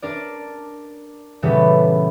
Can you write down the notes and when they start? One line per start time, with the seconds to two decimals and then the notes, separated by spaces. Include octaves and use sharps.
0.02 D4 A#4 D5
1.42 A#2 C#3 E3 G3 B3 A4